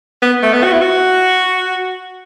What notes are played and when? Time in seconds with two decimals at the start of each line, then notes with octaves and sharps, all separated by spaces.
0.23 B3
0.43 A3
0.53 B3
0.64 F#4
0.72 E4
0.82 F#4